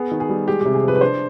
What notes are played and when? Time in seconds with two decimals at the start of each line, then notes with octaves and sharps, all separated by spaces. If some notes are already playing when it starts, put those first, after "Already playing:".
Already playing: B3 G#4
0.11 D#3
0.20 G#4
0.29 G3
0.47 G#3 G4
0.61 C3 G4
0.75 G#4
0.83 F3 B4
0.96 B4
1.01 D4 C5